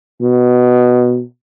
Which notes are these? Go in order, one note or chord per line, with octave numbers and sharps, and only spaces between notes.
B2